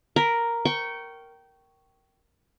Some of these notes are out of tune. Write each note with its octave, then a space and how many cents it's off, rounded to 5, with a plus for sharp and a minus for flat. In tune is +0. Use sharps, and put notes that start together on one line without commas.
A#4 +0 B5 +0
G5 -20 C#6 +0